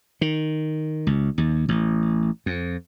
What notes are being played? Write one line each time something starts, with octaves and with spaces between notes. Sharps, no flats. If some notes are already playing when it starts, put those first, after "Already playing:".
D#3
C#2
D#2
A1
F2